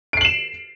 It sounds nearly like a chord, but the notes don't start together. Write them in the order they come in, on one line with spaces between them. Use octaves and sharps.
D7 C7 F#7 E7